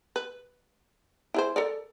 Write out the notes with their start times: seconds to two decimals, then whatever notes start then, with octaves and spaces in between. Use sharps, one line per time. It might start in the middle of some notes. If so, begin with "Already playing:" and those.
0.16 B4
1.34 E4 G#4 C5
1.56 A4 A#4 D5